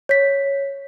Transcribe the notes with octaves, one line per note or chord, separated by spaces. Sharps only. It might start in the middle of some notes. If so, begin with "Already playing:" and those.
C#5 B6